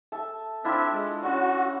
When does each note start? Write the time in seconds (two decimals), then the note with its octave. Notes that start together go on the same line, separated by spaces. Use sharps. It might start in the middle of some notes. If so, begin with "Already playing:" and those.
0.12 A4 E5 A5
0.65 C4 D4 E4 F4 E5
0.92 G#3
1.22 C#4 F#4 D5